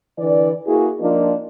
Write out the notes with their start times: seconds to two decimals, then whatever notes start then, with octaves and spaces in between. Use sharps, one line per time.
0.19 D3 E3 D5
0.66 A#3 E4 F#4 G#4
1.01 F3 A#3 D4 D#4 F4